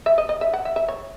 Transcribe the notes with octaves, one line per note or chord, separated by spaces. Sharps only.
E5
D#5
D#5
E5
F#5
E5
E5
C#5